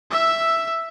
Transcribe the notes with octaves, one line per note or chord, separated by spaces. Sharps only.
E5 E6